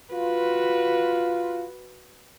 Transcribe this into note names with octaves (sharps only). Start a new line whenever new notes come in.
F4 F#4 B4